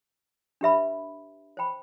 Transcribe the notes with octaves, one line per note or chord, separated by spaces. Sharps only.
D4 G4 B4 E5 B5
C5 G5 B5